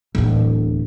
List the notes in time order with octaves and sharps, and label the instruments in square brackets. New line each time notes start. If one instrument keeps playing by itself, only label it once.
[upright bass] D1 E2